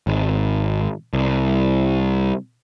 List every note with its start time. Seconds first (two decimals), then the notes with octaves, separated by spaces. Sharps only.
0.07 G#1
1.13 C2